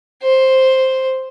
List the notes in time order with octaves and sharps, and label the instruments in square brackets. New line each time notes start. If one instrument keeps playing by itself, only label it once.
[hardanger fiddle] C5